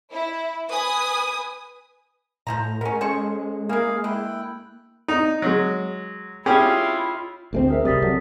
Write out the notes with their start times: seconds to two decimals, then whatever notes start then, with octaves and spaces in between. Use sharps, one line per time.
0.11 E4
0.68 B4 G#5 D#6
2.47 A2 F3 E4 A#5
2.81 G#3 B3 C#4 A#4
3.01 C#4 G#4 A4 C5 C#6
3.69 E3 A#3 G#4 A#4 F5 G#5
4.04 D3 E4 G5 F#6
5.08 D#4
5.42 F#3 G#3
6.46 C#4 E4 F4 G4 G#4
7.53 D2 G#3 C4
7.68 G#4 A#4 E5
7.85 C2 G3 D#6 A6 B6
8.02 F#3 C4 A4